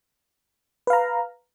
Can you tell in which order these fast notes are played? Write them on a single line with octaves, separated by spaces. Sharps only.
B4 F5 A#5